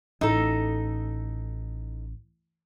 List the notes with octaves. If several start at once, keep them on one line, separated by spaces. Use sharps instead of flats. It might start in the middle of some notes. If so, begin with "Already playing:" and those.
A1 D#4 A4